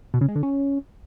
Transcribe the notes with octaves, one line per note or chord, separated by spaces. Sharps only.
B2
C#3
G#3
D3
C#4